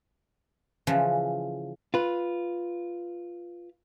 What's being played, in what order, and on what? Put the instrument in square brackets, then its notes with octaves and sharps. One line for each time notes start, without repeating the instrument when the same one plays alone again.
[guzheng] C#3 E3 F3
[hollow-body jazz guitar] F4 B4